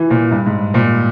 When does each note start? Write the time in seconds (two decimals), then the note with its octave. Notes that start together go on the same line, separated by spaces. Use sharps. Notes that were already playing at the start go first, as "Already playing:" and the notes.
Already playing: E3
0.10 A#2
0.31 G2
0.46 G#2
0.74 A#2